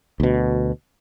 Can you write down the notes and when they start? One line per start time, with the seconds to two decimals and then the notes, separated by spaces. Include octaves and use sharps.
0.20 D2 B2